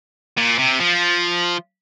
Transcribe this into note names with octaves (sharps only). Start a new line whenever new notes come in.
A#2
C3
F3